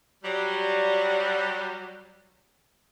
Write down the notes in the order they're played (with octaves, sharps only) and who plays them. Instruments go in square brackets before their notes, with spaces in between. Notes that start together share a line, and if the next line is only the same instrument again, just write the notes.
[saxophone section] F#3 G3